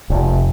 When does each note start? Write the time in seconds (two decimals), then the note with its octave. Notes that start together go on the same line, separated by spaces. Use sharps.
0.10 F1